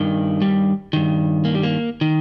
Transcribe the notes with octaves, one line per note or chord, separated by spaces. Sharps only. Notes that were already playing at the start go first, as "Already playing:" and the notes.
Already playing: G2 D#3
G3
G2 D#3
A#3
G3
A#3
D#3